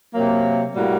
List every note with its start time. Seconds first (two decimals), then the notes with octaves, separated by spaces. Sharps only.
0.14 C3 F#3 A#3
0.75 A2 G3 A#3 F#4